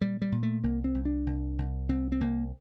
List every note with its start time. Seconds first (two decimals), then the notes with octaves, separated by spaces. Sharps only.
0.01 A#2 G3
0.22 G3
0.32 A#2
0.43 A3
0.64 C2 A#3
0.84 C4
0.94 C2
1.05 D4
1.26 C2
1.58 C2
1.89 C2 C4
2.12 C4
2.21 C2 A#3